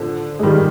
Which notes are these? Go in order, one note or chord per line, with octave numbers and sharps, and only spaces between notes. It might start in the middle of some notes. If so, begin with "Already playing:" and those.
Already playing: D3 F3
G#3
D#3 G3